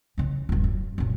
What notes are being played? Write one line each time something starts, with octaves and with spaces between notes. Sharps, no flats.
C#3 E3
D#1 G2
F#2
F#2 A#2